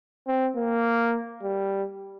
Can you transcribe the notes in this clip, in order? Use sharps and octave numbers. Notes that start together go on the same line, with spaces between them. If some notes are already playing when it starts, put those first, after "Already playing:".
C4
A#3
G3